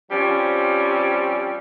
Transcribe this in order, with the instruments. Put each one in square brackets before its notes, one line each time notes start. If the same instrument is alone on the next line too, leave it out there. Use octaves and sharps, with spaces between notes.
[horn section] F3 G3 C4 C#4